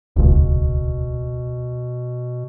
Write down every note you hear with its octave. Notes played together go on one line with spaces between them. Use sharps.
D#1 C#2 B2